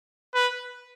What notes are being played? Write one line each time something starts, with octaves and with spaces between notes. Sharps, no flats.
B4